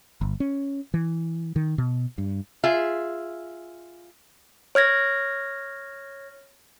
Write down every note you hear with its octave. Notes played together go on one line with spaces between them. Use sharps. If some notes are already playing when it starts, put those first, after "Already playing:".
G1
C#4
E3
D#3
B2
G2
F4 G#4 E5
C#5 F6 G#6 A#6